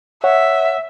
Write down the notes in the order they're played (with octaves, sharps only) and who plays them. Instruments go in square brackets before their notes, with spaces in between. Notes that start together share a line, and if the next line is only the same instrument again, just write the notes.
[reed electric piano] C#5 F#5 [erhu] E5